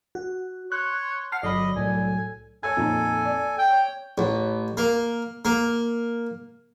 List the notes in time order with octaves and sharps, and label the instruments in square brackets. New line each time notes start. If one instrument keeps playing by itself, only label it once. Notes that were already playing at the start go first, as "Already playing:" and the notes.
[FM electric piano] F#4
[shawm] C#5 [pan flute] C6 [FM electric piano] F#6
[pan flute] F#5 [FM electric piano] A5 F6 C7
[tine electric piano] G1 F#3 B5 [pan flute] A4 [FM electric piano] D5 [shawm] D#5
[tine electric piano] C2 A2 F#3 [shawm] G#5
[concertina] A4 G#5 [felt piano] C#5 A5 G#6
[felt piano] F2 A#2 D#4
D5
[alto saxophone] G5
[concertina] C#5
[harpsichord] A1
A#3
A#3